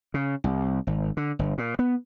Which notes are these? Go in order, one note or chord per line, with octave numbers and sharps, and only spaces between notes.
C#3
C2
G#1
D3
G1
A#2
B3